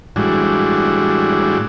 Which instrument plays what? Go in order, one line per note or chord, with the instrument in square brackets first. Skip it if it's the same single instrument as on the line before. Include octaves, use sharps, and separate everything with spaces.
[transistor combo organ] A2 E3 G3 G#3 D4 F#4